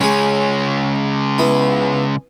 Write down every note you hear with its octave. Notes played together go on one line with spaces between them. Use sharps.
C#3 G#3 C#4 G#4
B3 E4